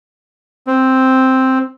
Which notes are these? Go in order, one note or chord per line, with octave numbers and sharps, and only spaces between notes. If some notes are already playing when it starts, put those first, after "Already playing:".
C4